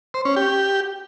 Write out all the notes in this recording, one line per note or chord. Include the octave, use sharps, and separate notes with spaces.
C5
C#4
G4